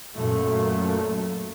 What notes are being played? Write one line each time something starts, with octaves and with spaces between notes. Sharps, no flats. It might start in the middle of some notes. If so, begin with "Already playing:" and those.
F#2 A#2 A3